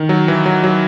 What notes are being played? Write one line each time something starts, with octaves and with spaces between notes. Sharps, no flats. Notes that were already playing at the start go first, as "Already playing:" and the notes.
Already playing: D#3
F#3
E3
F#3
F#3